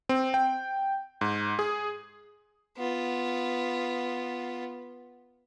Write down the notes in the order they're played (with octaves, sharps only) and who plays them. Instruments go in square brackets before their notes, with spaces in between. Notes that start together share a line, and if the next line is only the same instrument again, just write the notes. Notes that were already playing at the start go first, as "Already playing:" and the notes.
[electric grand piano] C4
G5
G#2
G#4
[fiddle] B3 F4